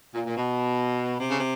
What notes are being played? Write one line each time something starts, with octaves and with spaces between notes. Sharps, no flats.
A#2
A#2
B2
C3
C#3
C3